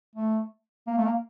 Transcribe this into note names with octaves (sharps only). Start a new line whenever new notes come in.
A3
A#3
A3
A#3